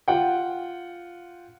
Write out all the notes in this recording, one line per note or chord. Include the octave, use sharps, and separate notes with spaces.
F4 F#5 G5